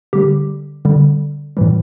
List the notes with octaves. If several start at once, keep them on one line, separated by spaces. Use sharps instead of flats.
D3 G3 G4
D3 G3
A2 E3 G3